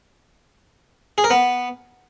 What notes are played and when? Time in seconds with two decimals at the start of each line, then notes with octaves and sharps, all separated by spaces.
1.18 G#4
1.24 A#4
1.30 B3